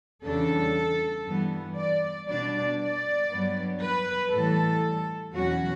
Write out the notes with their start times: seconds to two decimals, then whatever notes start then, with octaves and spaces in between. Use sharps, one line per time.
0.24 E2 C#3 G3 D4 A4
1.26 G2 E3 G3 B3
1.77 D5
2.28 B2 G3 D4 D5
2.79 D5
3.30 G2 F#3 B3
3.80 B4
4.31 A2 E3 G3 A4
5.34 E2 B2 F#3 C#4 F#4